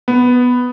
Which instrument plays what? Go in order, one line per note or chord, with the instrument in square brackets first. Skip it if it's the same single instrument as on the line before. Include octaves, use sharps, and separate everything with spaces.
[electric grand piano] B3